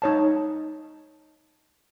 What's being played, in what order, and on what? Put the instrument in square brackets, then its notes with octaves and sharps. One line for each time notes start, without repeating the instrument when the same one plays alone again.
[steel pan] D#4 C#5 A5